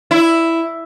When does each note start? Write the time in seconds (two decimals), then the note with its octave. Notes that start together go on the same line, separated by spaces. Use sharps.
0.11 E4